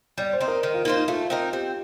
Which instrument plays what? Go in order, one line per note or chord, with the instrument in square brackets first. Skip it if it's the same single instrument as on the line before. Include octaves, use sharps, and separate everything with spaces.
[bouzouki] G3 [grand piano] D5
[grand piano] C5
[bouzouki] C4 D#4
[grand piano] A#4
[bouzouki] D#3
[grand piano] F4
[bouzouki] A#3 F4 C5 [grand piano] D#4
[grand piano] D#4
[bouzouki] A3 [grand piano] F4
[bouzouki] C4 D#4 A#4
[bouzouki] C4 [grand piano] G4